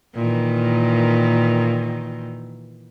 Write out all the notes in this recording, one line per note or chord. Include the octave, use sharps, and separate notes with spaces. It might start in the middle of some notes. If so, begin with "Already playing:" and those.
A#2 D#3 E3